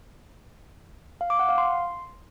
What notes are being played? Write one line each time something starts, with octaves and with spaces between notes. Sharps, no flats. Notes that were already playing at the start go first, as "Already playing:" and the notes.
F5
D6
F#5
F5
C6